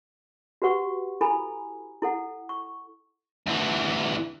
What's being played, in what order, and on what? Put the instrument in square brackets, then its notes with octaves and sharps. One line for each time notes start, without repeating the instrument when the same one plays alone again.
[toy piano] F#4 G4 B4 F#5 C#6
E4 A4 G#5 A#5 B5
E4 A4 F#5
C#6
[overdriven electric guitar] D2 E3